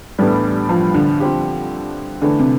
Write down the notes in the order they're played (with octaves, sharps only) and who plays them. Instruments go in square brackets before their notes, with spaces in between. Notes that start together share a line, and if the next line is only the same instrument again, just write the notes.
[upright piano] A2 E3 B3 D4 A4 [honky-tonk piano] G3
[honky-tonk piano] F3
D3
[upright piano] F3 C4 G4
[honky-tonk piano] D3 [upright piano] E3 A3 D4
[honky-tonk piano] C3